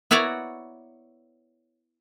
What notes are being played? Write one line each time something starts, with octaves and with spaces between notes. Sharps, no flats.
B3 E4 F#4 C#5 D5 A#5